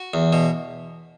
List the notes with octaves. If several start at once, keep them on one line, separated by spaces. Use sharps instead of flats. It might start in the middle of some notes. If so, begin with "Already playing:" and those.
Already playing: F#4
E2
B2